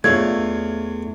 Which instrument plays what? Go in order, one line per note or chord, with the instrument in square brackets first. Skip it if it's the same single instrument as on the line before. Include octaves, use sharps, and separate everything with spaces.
[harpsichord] E2 [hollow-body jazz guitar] A3 [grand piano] D4 F4 C#5 [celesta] G#6